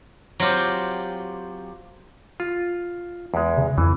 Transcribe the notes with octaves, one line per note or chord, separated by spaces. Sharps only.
F#3 C4 F4 G4
F4
E2 G#3
C#3
F2 E3